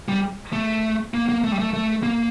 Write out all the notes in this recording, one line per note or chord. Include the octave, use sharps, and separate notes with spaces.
G3
A3
A#3
A#3
A3
G3
A3
A3
A#3